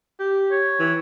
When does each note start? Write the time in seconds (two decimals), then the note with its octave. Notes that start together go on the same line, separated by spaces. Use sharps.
0.19 G4
0.52 C#5
0.80 E3